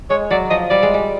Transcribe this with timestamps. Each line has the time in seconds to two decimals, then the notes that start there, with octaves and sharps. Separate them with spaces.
0.10 G#3 C#5
0.30 F#3 D5
0.50 F3 D#5
0.70 G3 D5
0.83 G#3
0.94 G3